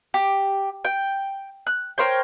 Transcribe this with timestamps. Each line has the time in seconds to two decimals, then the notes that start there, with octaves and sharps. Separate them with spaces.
0.14 G4
0.85 G5
1.67 F#6
1.98 A#4 C5 C#5 G5